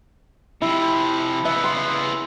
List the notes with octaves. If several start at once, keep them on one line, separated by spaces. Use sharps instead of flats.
C3 F3 E4
C#3 B3 E5
C6